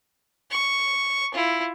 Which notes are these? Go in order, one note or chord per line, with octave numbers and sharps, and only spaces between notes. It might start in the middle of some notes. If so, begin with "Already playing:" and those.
C#6
E4 F4